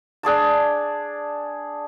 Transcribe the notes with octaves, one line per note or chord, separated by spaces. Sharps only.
D4 G#4 D5 A5